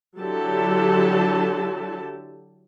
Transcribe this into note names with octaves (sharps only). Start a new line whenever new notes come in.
D3 F#3 E4 G4 A4 A5